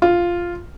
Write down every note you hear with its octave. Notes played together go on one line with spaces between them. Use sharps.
F4